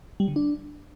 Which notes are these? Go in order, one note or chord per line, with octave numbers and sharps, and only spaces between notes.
G3
D3
D4